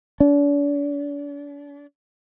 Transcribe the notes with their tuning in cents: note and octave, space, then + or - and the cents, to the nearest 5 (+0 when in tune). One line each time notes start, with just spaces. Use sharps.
D4 -40